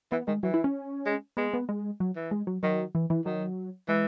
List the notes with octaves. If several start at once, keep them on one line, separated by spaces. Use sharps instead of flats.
E3 B3
D#3 G#3
E3 F#3
E4
C#4
G#3
G#3 B3
B3
G#3
F#3
E3
G#3
F#3
D#3 F#3
E3
E3
D#3 F#3
E3 G#3